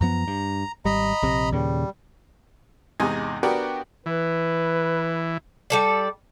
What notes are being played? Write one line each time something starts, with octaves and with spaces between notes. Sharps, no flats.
F#2 F3 B3 A#5
G2
G#1 G3 D#5 A#5 B5
A#1 C3
D#2 A#2 C#3 G3
E2 G#2 C3 D#4 G#5
B3 D4 F#4 G4 A#4
E3 B4
G3 A4 D5